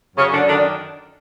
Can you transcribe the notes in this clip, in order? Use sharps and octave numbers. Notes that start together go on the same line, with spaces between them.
F#2 C#3 C#4
D3 D4
D3 D#3 D4